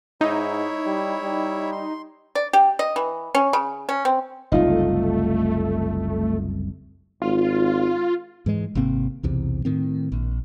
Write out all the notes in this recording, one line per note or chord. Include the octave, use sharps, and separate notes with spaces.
G#2 D#4 E4 C#5 E5
G3
G3
C6
D5
G4
D#5
E3
C#4
C#3
C#4
C4
F#1 C2 A3 D#4 F4
G#1 F4
G#2 E3 G#3
G#1 C3 A#3 C4
B1 E2 C3
A2 D#3 C4
A#1